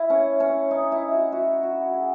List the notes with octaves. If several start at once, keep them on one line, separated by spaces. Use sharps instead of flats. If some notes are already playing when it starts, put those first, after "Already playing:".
Already playing: E4
C#4
C#4
D#4
E4
F#4
F#4
F#4
G#4